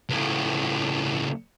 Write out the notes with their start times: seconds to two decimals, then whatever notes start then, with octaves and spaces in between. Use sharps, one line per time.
0.09 C#2 A2